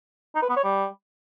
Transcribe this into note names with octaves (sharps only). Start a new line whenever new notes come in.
D#4
B4
B3
C#5
G3